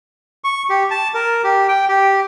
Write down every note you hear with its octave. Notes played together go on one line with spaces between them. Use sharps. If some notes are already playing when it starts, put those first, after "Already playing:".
C#6
G4
A5
A#4
G4
G5
G4